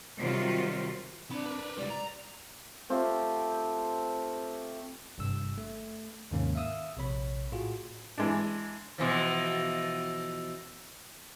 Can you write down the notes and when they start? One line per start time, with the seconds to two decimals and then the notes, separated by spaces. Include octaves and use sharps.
0.20 C3 D#3 F#3 G3 F4 F#4
1.31 C4 D4 B5
1.46 A#4 B4
1.77 C#2 G3 D5
1.90 A#5
2.89 A3 C4 F4 G4
5.18 G#1 G2 C3 E6
5.58 A3
6.31 D#2 G#2 C3 D#3 A#3 C#4
6.55 E5 F5 D#6 E6
6.97 A#1 C3 C#5 B5
7.52 A2 F4 F#4 G#4
8.18 E3 G#3 D4
8.98 B2 E3 F3